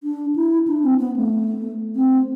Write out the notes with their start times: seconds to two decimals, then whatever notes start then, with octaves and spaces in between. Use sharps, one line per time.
0.04 D4
0.36 E4
0.68 D4
0.84 C4
1.00 B3
1.16 A3
1.96 C4